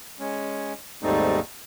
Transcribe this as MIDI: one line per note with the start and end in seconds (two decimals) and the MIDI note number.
0.20 0.73 56
0.20 0.73 61
1.03 1.40 39
1.03 1.40 44
1.03 1.40 55
1.03 1.40 57
1.03 1.40 60
1.03 1.40 63